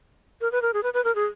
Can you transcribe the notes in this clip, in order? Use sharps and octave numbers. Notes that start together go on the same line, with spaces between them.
A#4
B4
A#4
G#4
B4
B4
A#4
G#4